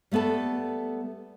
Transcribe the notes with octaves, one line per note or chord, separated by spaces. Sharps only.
G3 A3 B3 A4 A5